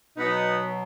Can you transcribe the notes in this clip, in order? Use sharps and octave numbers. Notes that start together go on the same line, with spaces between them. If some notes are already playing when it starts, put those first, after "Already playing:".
B2 F#3 B3 D#4